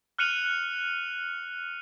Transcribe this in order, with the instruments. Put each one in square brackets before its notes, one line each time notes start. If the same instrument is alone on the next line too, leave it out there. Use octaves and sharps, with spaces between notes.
[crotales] F6 F#6 C#7 D#7 F7 F#7